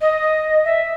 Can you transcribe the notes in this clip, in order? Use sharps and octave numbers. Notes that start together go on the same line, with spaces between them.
D#5
E5